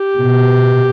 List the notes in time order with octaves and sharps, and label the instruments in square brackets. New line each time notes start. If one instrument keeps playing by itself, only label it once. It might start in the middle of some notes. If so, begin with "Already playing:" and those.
Already playing: [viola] G4
[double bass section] B2